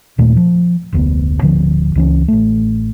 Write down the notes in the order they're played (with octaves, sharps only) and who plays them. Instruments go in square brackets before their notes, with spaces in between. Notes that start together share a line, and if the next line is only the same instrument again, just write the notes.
[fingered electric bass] D#2 A#2 A3
F3
F1 D2 B3
D1 D3 F3
C#2 E3 C#4
A1 A3